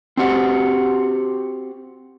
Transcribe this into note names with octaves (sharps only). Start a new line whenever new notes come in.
C4 F#4 G4 F#5